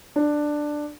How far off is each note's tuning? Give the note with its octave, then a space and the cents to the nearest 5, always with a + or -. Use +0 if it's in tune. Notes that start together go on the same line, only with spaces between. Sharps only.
D4 +10